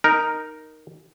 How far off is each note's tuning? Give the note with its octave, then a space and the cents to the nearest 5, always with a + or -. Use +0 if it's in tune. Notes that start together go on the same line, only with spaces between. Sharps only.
D#4 +0 A#4 +0